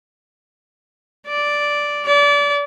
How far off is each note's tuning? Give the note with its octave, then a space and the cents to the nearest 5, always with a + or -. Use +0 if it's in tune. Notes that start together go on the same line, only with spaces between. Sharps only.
D5 -5
D5 -30